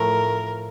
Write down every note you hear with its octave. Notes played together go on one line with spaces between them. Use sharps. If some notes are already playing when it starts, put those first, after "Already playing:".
Already playing: A2 F3 A3 A#4